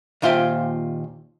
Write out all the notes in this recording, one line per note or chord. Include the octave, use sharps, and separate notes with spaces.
D#2 A#2 F4 C5 E5 G5